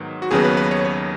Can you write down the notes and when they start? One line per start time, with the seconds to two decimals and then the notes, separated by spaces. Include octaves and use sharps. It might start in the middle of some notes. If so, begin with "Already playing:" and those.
Already playing: G#2 D#3 F#3 B3
0.22 F#4
0.31 D#2 C#3 F#3 B3 G#4
0.44 B4
0.57 B4
0.71 C#5
0.85 C#5